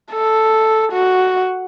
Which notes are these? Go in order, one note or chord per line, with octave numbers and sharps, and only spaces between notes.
A4
F#4